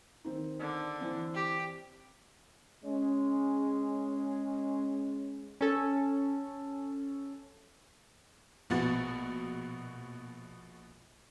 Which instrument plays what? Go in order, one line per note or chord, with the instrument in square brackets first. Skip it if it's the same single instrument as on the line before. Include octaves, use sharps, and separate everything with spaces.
[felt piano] D#3 C4 D#4
[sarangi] D3
[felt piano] E3 C4
[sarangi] G4
[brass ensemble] G#3 C#4
[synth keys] C#4 A4
[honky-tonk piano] A#1 B2 B3 F#4 A6